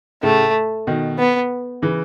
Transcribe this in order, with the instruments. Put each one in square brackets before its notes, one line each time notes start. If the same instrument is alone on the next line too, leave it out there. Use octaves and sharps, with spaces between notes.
[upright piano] A2 C#3 [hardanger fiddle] A3
[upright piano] B2 D#3
[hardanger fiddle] B3
[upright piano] C#3 E3